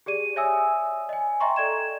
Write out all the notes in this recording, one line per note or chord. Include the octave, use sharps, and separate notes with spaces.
G4 G#4 D5 D#7
C#5 D5 E5 G#5 D#6 E6
D#5 G#5
D#5 E5 G5 A#5 C6 C#6
A4 D5 G#6 E7